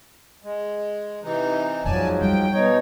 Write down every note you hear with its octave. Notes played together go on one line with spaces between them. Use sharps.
G#3
C3 E3 D#4
F2 G#2 F3 F#3 D#4 D5 G#5 A5
G3 G5
B2 D#4 C#5